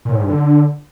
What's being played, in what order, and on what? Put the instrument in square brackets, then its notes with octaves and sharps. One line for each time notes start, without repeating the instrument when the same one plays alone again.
[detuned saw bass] A#2
A2
G#2
G2
D3